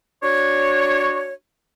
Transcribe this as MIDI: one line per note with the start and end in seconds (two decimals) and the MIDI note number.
0.23 1.33 62
0.23 1.33 66
0.23 1.33 73